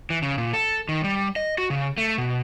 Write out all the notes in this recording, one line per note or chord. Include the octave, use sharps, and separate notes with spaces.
E3
C#3
A#2
A4
D#3
G3
D#5
F#4
C#3
A3
B2